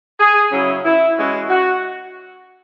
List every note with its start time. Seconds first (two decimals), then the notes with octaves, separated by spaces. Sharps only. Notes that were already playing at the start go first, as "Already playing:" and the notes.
0.19 G#4
0.52 C#3 F#3 C#4 E4
0.84 E4
1.17 E3 G#3 C#4 E4 F#4
1.49 F#4